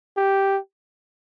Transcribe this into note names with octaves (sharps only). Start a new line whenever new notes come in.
G4